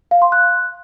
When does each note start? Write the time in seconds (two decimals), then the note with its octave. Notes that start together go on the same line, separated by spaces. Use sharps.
0.11 F5
0.22 C6
0.32 F#6